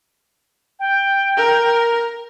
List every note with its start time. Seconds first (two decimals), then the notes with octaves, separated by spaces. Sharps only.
0.79 G5
1.37 A#4